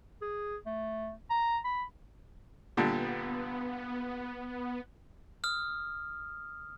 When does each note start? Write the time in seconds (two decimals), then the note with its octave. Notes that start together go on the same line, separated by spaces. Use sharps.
0.22 G#4
0.66 A3
1.30 A#5
1.65 B5
2.77 A#2 D3 G3 B3
5.44 D#6 F6